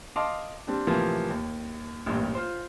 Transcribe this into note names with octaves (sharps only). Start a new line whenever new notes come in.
D#5 F5 A5 C6 D6
G3 C4 D4
A2 C3 E3 F3 G3 A#3
D#2
A1 G2 A#2
F4 C5